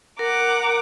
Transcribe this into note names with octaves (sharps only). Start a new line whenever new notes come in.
A#4 F#5 A#5 D6